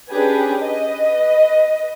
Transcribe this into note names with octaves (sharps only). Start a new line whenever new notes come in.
C#4 D4 G4 G#4 B4
B4 D#5